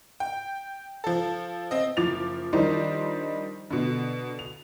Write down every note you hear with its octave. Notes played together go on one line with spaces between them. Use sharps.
G5
F3 A4
C4 D#5
F#1 F3 D6 A6 F7
D#3 F3 G3 D4 D#4 C5
B2 D3
F7